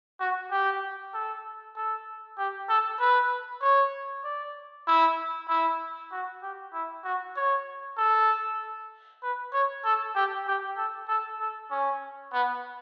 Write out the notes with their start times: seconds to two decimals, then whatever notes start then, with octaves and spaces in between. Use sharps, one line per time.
0.20 F#4
0.51 G4
1.14 A4
1.76 A4
2.38 G4
2.69 A4
3.00 B4
3.62 C#5
4.24 D5
4.87 E4
5.48 E4
6.12 F#4
6.42 G4
6.73 E4
7.04 F#4
7.36 C#5
7.98 A4
9.23 B4
9.53 C#5
9.84 A4
10.15 G4
10.47 G4
10.77 A4
11.08 A4
11.40 A4
11.71 C#4
12.33 B3